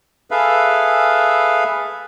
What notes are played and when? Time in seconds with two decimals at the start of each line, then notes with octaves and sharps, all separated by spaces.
0.31 G#4 A4 B4 E5 F5